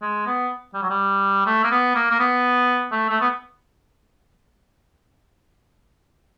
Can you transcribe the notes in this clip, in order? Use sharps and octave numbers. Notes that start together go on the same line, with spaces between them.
G#3
B3
G3
F#3
G3
A3
A#3
B3
A#3
A#3
B3
A3
A3
B3